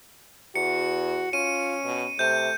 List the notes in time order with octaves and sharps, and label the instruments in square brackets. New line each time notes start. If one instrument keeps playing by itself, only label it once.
[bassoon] E2 [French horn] F#4 [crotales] C#7
[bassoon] C#4 [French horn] F4 [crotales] D#7
[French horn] B2
[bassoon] C3 [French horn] A3 [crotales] G6 D#7